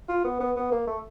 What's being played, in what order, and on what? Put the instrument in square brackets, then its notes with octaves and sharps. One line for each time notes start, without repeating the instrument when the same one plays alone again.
[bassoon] F4
B3
B3
B3
A#3
A3